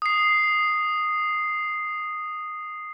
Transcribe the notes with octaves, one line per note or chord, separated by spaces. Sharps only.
D#6 C7